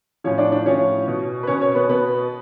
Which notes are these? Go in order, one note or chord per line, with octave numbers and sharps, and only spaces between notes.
A2 F3 C#4 C#5
D4 D5
D4 D5
A2 F3 C#4 C#5
B2
B4
B2 C#4 C#5
C#4 C#5
B3 B4
B2 B3 B4